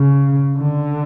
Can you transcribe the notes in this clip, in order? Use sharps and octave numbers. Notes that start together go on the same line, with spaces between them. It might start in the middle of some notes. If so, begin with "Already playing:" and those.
Already playing: C#3
D3